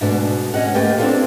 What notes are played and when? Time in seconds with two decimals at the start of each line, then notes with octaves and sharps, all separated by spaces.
0.01 G#2 B2 A3 B3 D4
0.54 C#4 D#5 F#5
0.74 D2 A3 A#3 G4 B4 G5
0.98 C4 D4 D#4 F4 A4 C#5